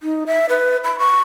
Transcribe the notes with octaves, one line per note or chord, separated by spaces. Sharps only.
D#4
E5
B4
B5
C#6